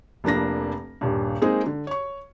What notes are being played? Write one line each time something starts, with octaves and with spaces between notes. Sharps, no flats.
F1 F2 A#3 D4 A#6
D#1 G2
G#3 A#3 C4 D#4 G#4
D3
C#5 C#6